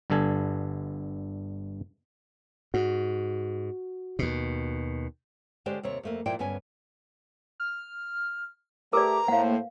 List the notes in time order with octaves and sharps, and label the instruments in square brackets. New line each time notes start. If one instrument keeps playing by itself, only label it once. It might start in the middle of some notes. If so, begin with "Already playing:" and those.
[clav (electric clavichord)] G1 G2 D3 A4 G#5
[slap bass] G#2 [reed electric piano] F#4
[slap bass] D#2 B2
[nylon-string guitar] D3 G#3 C#4 G4 C5 D5
D#2 C3 C4 C#5
F2 A3 A#3
A#2 F3 E4 C5 D5 G5
D2 G2 B3 C#4 G#5
[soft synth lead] F6
[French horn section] A3 G4 [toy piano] A#4 B4 D5 [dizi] A#5 [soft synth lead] D6
[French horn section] A2 C5 [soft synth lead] A#3 [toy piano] F5 F#5